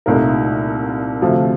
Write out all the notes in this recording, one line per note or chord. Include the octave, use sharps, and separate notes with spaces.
C2 A#2 A3 D#4 A#4
D2 C3 F3 A3